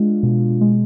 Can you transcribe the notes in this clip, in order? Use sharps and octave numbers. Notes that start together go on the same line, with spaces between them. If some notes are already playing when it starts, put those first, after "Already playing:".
Already playing: G#3 D4 F4
B2
G#3